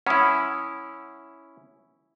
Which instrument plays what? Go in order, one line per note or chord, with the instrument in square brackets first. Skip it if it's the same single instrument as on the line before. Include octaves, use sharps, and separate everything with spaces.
[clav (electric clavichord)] C#4 E4 [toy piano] F#5 B5 D#6